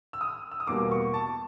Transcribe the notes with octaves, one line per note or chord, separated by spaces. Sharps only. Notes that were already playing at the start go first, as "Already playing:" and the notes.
E6
D#6
E6
D#6
E2 B2 G3 A#3 D6
C#6
A5